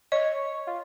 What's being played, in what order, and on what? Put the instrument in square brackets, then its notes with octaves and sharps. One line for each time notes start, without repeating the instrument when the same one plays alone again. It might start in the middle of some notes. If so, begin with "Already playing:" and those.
[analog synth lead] C#5 [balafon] D#5
[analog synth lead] F4